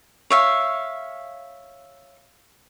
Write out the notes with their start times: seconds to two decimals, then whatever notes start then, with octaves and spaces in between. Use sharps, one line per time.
0.30 C#5 E5 F5